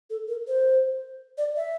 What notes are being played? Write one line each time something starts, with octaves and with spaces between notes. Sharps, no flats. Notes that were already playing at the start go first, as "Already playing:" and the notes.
A4
A#4
C5
D5
E5